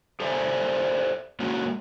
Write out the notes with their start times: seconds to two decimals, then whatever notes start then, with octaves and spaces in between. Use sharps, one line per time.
0.20 G4 A4 C5 D5 E5 G#5
1.40 G#3 A#3 C#4 F#4